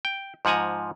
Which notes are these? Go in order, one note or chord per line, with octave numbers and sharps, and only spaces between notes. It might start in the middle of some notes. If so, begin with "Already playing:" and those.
G5
G#2 F3 F#5 G#5 A#5